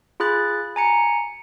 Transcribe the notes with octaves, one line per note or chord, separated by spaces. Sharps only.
F4 G#4 B5 F#6 A6
G#5 A#5 C#7